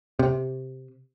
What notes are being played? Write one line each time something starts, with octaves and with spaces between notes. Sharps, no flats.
C3